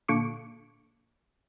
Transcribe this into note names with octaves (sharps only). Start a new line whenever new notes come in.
A#2 D3 C#6 D6